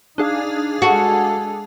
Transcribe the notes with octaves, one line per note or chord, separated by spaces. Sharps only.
D4 D#4 G#4 F5
G#3 F#4 A4